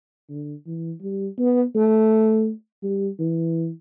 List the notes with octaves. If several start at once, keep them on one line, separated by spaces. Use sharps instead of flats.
D3
E3
G3
B3
A3
G3
E3